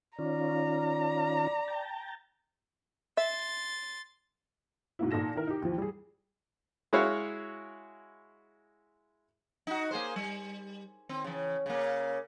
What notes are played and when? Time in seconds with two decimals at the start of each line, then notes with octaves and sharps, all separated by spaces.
0.19 D#3 C#4 F4 D5 A#5
1.68 G5 A5
3.17 E5 C6 A6
4.99 G#2 B2 A#3 E4
5.11 A#2 D#4 A4 A#6 E7
5.35 D#3 E4 A#4
5.47 D#4 G4
5.62 D#2 E3 F3
5.78 G3 G#4
6.93 G#3 E4 F#4 C#5 F5
9.67 D#4 F#4
9.91 A#3 G#4 C5
10.16 G3
11.09 D#3 C4
11.24 C#3 E3
11.66 C#3 A#3